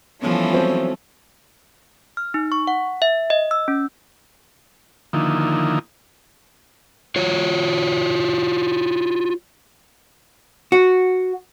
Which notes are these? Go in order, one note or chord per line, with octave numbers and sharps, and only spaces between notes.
E3 F3 G3 A3 B3 C#4
F#3 C4
F6
D#4
C#6
F#5
E5
D#5
E6
C#4
D3 D#3 F3 A#3 D#4 E4
F4 F#4 C#5
F#4